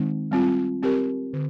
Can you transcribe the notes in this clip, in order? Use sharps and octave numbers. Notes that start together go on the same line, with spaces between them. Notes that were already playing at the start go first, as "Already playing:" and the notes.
Already playing: D#3 G#3 C4 D#4
G3 C4 F4
C4 G4 A#4
D3